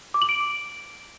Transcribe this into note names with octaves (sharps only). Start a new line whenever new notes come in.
D6
F#7
D7